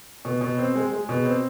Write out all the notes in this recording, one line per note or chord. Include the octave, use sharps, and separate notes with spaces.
B2
B2
C4
G#3
G#3
B2
C4